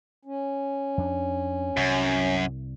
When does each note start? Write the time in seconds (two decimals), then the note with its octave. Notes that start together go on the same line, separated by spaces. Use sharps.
0.25 C#4
0.97 F2 D4
1.77 C2 F#2